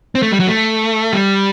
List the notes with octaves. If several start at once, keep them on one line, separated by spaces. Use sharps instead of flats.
C4
A3
G3
F#3
A3
G3